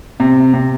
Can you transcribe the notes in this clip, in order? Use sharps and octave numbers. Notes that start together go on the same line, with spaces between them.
C3
C3